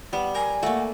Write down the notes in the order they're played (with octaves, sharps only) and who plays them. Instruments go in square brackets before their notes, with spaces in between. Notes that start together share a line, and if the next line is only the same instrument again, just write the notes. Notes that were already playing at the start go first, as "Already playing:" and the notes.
[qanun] G3 [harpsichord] B3
[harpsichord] A#4 [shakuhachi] G#5
[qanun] A3 A#3 [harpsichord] F#4